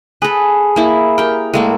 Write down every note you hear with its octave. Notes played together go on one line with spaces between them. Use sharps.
G#4 A4 B4
A#3 E4
G4 A#4 G5
A2 G#3 A#3 A4